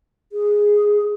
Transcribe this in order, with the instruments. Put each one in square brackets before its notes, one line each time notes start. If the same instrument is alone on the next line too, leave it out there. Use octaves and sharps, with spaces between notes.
[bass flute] G#4